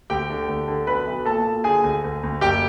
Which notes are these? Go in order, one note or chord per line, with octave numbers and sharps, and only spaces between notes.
D2 G4 G5
D3
D2
D3
B1 B4 B5
B1
A#2 A4 A5
A#2
D3 G#4 G#5
D2
D2
D2
F#1 G4 G5